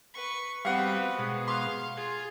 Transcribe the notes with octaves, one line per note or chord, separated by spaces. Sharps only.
B4 C#6
G3 B3 C4 F#4 B4 F5 F#5
B2 G#3
F5 C6
F4 G#4